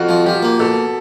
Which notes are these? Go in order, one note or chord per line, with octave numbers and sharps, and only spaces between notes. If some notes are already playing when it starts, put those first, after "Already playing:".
Already playing: F2 F4 F#4
F3
F3 G4
A#3
B2 A4